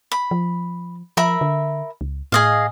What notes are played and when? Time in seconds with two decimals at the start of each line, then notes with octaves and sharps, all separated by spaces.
0.12 B5
0.31 F3
1.17 F3 A#4 E5 B5
1.41 D3
2.01 C#2
2.32 A2 G#4 D#5 F5